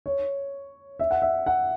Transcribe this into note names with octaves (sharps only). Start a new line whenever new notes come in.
C#5
E5
F#5
E5
F#5